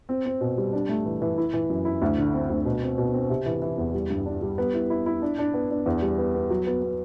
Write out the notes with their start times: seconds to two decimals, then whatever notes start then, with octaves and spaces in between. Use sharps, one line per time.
0.09 C4
0.25 C4
0.41 B2
0.58 G3
0.73 D4
0.89 A3
1.06 E3
1.22 E3
1.38 E4
1.54 E3
1.69 F#2
1.85 E4
2.02 D2
2.18 D3
2.33 C4
2.49 D2
2.65 B2
2.82 C4
2.98 B2
3.14 C4
3.30 C3
3.46 E3
3.62 E3
3.78 E2
3.94 G3
4.10 G2
4.26 D4
4.42 G3
4.58 B3
4.74 E4
4.90 E4
5.06 E4
5.22 D4
5.38 D4
5.54 B3
5.70 D4
5.86 E2
6.02 G3
6.18 B3
6.35 B3
6.50 F#3
6.67 B3
6.82 B3